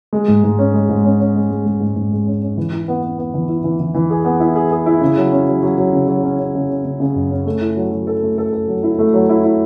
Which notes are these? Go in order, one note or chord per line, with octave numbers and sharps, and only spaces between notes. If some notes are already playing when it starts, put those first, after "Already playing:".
G#3
G#2
G#2
C#4
G#3
G#2
C#4
C#4
G#3
G#3
G#3
G#2
G#2
G#3
C#4
C#4
E3
E4
B3
B3
B3
E3
E4
E3
E3
E3
G#4
B3
E4
G#4
G#4
E4
C#3
F#3
C#4
F#3
F#3
F#3
C#3
F#3
C#4
C#4
C#3
C#4
C#3
C#3
F#2
C#4
A3
E4
F#3
F#3
A4
A3
A4
A4
F#3
E4
A3
F#3
E4
E4